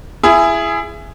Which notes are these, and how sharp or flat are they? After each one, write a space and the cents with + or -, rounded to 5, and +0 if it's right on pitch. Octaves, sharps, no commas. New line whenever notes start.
E4 +25 G#4 +0